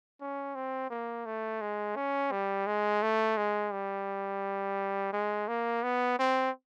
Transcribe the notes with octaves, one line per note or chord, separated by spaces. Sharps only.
C#4
C4
A#3
A3
G#3
C#4
G3
G#3
A3
G#3
G3
G#3
A#3
B3
C4